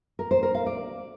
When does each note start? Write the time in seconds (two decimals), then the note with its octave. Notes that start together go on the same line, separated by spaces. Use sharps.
0.19 A#4
0.31 C5
0.43 A#4
0.55 F5
0.66 D5